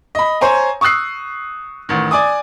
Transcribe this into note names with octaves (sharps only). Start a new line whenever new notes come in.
D#5 B5
C5 C#5 G#5 A#5
C#6 D#6 E6 F#6 C7
A1 D#3
D5 G#5 D6 D#6